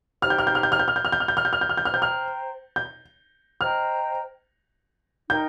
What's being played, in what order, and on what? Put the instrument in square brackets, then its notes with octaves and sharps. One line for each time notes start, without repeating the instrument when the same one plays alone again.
[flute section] D#4 G4 C5 G5 [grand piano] F6
[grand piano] G6
F6
G6
F6
G6
F6
G6
F6
G6
F6
G6
F6
G6
F6
G6
F6
G6
F6
G6
F6
[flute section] C5 G5 A#5 [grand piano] G6
[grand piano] F6
G6
[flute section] C5 D#5 G5 A#5 [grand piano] F6
[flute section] D#4 A#4 G5 [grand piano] G6